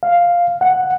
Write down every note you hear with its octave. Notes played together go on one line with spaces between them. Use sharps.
F5
F#5